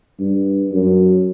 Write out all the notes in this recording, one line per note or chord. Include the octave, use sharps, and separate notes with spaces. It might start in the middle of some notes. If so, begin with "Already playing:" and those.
G2
F#2